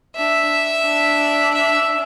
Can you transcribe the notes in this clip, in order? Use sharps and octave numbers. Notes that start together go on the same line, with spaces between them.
D4 E5
D4
E5